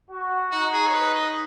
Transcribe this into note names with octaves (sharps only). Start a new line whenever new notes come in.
F#4
D#4 F#4
G#4
C#5
B4
D#5